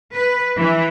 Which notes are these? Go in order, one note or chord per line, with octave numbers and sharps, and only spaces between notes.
B4
E3